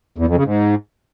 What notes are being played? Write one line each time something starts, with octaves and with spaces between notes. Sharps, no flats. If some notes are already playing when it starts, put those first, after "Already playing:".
E2
F2
C#3
G#2